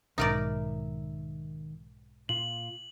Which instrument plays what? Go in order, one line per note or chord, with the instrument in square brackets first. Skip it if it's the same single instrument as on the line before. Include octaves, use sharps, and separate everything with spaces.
[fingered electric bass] B1 G#2 [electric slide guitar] D#3 E5 [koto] D#4 A#4 D5
[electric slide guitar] A#2 F4 [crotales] F#7